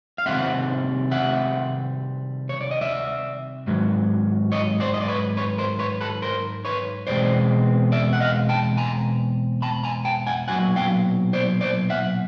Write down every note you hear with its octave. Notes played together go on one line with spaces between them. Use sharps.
F5
C3 D#3 G3 C4 E5 F#5
E5 F#5
C#5
D5
D#5
D5 E5
G#2 D#3 F#3
C#5 D#5
C5 D5
D#5
D5
B4 C#5
B4 C#5
A#4 C5
B4 C#5
A4 B4
A#4 C5
B4 C#5
E2 B2 G#3 C4 C5 D5
D5 E5
F#5
D#5 F5
G5 A5
G#5 A#5
A5 B5
G#5 A#5
G5 A5
F#5 G#5
B1 A#2 F#3 F#5 G#5
F5 G5
C5 D5
C5 D5
E5 F#5